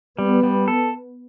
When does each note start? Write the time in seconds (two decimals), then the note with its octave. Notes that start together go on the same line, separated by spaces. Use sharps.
0.19 G3 B3
0.43 G3
0.68 A4